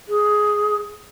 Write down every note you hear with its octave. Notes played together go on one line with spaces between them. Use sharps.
G#4